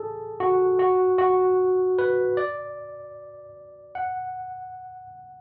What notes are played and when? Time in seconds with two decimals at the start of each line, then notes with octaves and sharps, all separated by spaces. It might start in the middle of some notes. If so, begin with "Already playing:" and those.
Already playing: G#4 A4
0.40 F#4
0.79 F#4
1.18 F#4
1.99 B4
2.37 D5
3.95 F#5